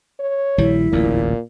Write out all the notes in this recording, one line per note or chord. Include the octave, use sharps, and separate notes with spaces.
C#5
A#1 D#3 G3 E4
D1 A1 E2 A#2